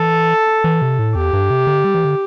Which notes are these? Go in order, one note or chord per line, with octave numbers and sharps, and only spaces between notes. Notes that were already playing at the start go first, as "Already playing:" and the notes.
Already playing: E3 A4
E3
C3
A2
E2 G4
G2
C3
D3
G3
E3
D3